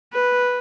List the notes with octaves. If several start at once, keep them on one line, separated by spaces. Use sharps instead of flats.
B4